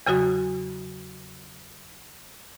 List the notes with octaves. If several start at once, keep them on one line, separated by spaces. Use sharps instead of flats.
E2 C#3 F#3 F#4 D#6